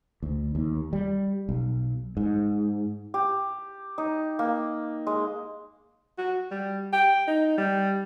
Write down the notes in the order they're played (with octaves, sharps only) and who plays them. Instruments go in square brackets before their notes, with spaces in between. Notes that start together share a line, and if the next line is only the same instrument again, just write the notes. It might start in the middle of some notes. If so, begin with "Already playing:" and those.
[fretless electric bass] D2
D#2
G3
B1
G#2
[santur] G4
D#4
A#3
G#3
[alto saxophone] F#4
G3
G5
D#4
G3